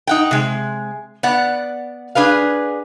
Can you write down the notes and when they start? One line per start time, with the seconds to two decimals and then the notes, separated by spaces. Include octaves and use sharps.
0.07 D#4 F#5 G5
0.31 C3 G#3
1.23 B3 D5 F#5
2.15 D4 G#4 B4 F5